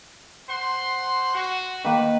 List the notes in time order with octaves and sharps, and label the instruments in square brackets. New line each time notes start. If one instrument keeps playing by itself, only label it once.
[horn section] C5 F#5 C6
F#4
[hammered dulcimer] D#3 A#3 [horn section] B4